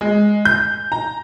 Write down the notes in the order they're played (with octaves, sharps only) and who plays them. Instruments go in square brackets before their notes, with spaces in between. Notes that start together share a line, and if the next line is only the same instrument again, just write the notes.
[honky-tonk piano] G#3
G6
A#5